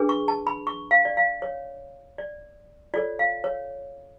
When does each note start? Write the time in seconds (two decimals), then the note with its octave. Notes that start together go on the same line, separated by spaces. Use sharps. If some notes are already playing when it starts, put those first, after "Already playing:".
Already playing: D4 G#4 B4
0.09 C#6
0.28 A5
0.47 B5
0.67 C#6
0.91 F5
1.05 D5
1.17 F5
1.42 C#5
2.18 D5
2.94 F4 A4 C#5 D5
3.19 F5
3.44 C#5